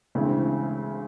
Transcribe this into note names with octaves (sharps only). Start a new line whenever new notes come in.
D2 C#3 E3 G#3 C4